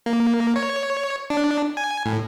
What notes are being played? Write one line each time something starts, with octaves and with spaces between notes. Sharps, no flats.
A#3
C#5
D4
G#5
A2